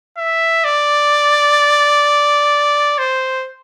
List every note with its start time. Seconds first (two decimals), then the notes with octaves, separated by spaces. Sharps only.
0.18 E5
0.65 D5
2.99 C5